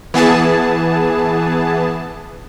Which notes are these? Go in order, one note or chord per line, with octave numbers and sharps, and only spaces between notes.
E3 B3 G#4 A5